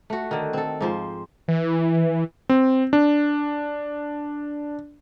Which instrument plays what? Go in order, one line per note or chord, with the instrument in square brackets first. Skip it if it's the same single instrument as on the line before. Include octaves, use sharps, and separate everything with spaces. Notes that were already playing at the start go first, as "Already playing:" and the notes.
[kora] A3 F#4
D3 D#3
C4 A4
G#2 F3 C5
[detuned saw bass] E3
[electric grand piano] C4
D4